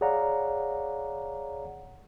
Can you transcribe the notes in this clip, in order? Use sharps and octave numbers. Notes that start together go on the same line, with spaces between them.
G#4 C#5 D5 F5 F#5 A#5